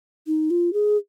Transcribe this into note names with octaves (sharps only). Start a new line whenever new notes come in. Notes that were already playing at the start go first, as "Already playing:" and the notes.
D#4
F4
G#4